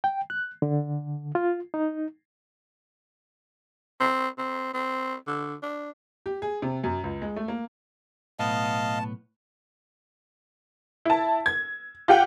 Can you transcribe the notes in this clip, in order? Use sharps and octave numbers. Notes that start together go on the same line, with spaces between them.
G5
F#6
D3
F4
D#4
C4
C4
C4
D3
D4
G4
G#4
C3
F#2
C#2
G#3
A3
A#3
B1 A2 B3 D#5 F5 A5
E4 A5
G#6
F4 G4 F#5 G5